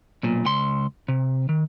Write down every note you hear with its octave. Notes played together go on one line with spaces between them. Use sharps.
B1 A#2
C#2 C6
C3
D#3